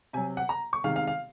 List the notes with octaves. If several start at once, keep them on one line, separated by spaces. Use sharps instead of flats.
C3 F#3 G#5
F#5
A#5
C#6
C3 D#3 G#3 F5
F5
F5